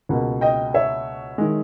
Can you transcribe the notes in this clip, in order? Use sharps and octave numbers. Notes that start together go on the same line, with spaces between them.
C#2 B2 A#3
D#5 G5
C#5 E5
D#3 G#3